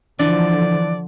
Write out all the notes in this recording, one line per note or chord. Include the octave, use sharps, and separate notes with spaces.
D3 E3 F3 D4 D5